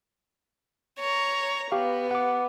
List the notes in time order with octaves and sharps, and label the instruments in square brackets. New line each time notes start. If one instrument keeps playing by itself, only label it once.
[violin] C#5 A#5
[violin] B3 [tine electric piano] G4 F5
[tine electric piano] F#5 D6